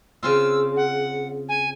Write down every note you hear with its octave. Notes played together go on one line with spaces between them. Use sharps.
C#3 C4 F4 E6
F#5
G#5